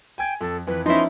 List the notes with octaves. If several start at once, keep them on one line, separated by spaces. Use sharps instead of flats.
G5 G#5 G#6
F2 A4
F2 E3 B4
F3 B3 C#4 D#4 E4 C6